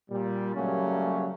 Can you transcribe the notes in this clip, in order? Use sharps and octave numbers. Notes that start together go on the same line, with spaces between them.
A#2 G3
C#3 F#3 G3 A3 A#3 C#4